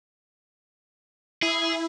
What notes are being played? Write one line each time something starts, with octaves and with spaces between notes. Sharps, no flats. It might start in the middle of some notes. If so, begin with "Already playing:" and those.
E4 G#4